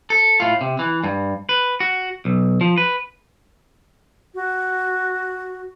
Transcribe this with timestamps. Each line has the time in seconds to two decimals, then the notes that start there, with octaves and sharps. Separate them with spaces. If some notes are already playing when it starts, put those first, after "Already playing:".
0.10 A4
0.40 A2 F4
0.61 C3
0.79 E3
1.04 G2
1.49 B4
1.80 F#4
2.25 B1
2.61 F3
2.78 B4
4.35 F#4